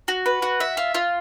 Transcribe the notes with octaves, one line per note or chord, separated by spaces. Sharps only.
F#4
B4
F#4
E5
F4
F4